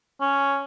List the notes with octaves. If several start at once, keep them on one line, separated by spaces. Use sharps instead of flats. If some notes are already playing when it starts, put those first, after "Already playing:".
C#4